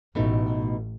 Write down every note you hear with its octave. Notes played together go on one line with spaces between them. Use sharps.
A1 B2 A3 D#4